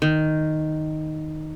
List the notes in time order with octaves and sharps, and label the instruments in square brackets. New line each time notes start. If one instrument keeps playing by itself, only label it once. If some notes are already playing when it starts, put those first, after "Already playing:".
[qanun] D#3